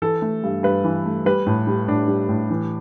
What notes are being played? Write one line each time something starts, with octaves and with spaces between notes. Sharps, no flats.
E3 A4
A3
G2
G2 B4
E3
A3
G3 B4
A2
G3
A2 D4
G3
A2
E3